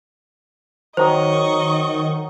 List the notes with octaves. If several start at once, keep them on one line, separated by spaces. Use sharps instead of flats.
D#3 F#3 C5 D#5 A#5 C#6 D#6